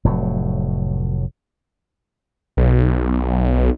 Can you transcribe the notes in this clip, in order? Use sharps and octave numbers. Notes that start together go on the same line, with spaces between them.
F1 A2 F#3
B1